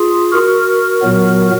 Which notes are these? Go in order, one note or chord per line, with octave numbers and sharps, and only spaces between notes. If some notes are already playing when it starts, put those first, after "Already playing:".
Already playing: F4 G#4
F#4 A#4
A#2 F#3 B3